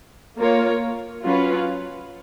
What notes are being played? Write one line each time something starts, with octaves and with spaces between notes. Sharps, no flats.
A#3 F4 A#4 C#5
F#3 C#4 F4 B4